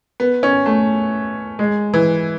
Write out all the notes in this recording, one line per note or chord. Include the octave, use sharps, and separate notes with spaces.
B3
C#4
A3
G#3
E3